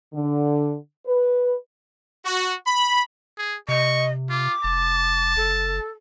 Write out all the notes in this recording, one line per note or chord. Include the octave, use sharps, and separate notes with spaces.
D3
B4
F#4
B5
G#4
C3 D#5 C#6
F4 D6
F1 A5
F#1 A4